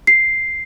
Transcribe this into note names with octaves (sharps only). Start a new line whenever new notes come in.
C7